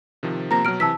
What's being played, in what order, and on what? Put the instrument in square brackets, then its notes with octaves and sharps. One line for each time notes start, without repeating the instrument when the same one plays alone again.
[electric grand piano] C3 D#3 F3
[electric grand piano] C3 F3 A#3 [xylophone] A#5 A#6
[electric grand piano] B2 F#3 [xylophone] F6 D7
[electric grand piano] C3 E3 [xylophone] A5 E6 B6